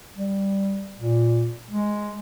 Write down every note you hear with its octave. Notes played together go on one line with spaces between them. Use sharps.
G3
A#2
G#3